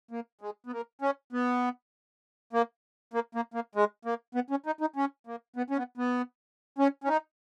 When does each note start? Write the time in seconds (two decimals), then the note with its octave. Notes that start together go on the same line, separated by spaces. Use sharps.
0.11 A#3
0.41 G#3
0.66 B3
0.72 A#3
1.02 C#4
1.33 B3
2.53 A#3
3.14 A#3
3.35 A#3
3.54 A#3
3.75 G#3
4.05 A#3
4.35 B3
4.50 C#4
4.66 D#4
4.81 D#4
4.96 C#4
5.27 A#3
5.56 B3
5.70 C#4
5.77 B3
5.98 B3
6.79 C#4
7.04 C#4
7.08 D#4